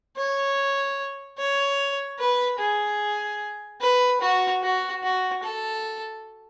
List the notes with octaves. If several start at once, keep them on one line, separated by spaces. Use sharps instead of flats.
C#5
C#5
B4
G#4
B4
F#4
F#4
F#4
A4